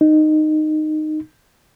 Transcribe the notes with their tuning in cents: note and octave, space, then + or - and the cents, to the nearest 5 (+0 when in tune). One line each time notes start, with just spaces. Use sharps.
D#4 -15